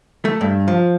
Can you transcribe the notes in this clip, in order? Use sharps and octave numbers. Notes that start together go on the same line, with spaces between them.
A3
G2
F3